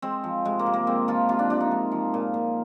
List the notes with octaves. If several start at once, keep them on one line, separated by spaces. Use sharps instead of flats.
G#3 C4
F3
C3 G#3
A#3
C3
A#3
G#3 C4
F3 F4
C3 F4
D4
C3 D4
D#4
G#3
F3
A#2
A#2